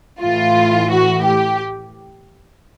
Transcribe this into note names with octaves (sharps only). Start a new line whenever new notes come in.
A2 E3 F4
F#4
G4